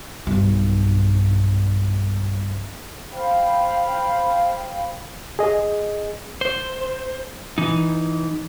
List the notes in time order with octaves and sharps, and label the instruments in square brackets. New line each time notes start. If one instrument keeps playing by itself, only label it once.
[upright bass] B1 G2
[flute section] C5 F5 G5 B5
[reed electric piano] G#4 D#5
[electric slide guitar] C5
E3 D#4